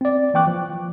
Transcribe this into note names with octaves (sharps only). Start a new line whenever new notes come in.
C4 D5
E3 A#3 G5 C#6 D6 F#6
F3